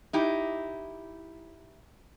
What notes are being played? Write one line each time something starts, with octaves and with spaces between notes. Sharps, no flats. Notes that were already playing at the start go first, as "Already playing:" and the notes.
D#4 E4 G4